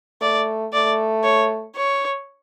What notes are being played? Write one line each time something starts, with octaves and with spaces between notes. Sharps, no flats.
A3 D5
A3 D5
C#5
C#5